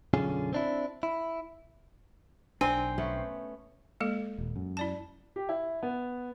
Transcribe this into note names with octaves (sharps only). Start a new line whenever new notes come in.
B1 F#2 D3 C#4 F4 G#4
C4 D4 E4
E4
B1 C4 D4 A#4 G#5
A3 B3 C#4
G#3 A#3 A4
D#1
F#2
E4 D5 A5
G4
E4
B3